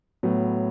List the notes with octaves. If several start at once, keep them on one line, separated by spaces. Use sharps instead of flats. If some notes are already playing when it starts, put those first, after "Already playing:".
A2 F#3 B3